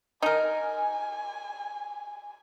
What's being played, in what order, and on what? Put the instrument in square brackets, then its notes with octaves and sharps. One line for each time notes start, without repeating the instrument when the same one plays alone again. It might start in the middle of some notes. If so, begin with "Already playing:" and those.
[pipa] D#4 A#4 [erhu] G#5